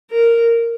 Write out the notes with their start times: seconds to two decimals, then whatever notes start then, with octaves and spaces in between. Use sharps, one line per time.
0.11 A#4